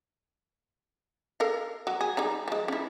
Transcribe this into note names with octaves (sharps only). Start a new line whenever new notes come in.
A4 A#4 F5
F#3
G#4
G3 D#4 A#5
F3 G#3
C#4 E4